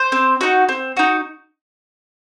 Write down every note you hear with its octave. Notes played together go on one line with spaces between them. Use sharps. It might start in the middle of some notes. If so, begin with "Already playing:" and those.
Already playing: C5
C4
D#4 F#4
C4
D#4 F#4